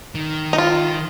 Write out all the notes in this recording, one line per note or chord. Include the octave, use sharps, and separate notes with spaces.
D#3
D#4
F4